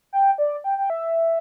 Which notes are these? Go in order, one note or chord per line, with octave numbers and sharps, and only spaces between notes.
G5
D5
G5
G5
E5